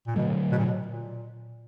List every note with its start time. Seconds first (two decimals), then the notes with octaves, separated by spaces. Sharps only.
0.07 A#2
0.16 B2 D3 F#3 A3
0.52 B2
0.58 A#2
0.66 B2
0.87 A#2